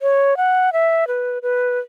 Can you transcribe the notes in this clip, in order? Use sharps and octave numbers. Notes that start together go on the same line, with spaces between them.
C#5
F#5
E5
B4
B4